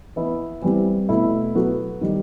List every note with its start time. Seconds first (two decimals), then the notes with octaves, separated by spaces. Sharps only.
0.16 E3 B3 E4
0.62 E3 G3 C4
1.09 B2 A3 E4
1.55 F#3 B3 F#4 A4
2.01 D#3 G3